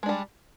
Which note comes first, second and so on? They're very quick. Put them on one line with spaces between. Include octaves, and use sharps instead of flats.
G#3 D4 G3